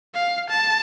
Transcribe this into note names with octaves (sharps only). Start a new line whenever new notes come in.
F5
A5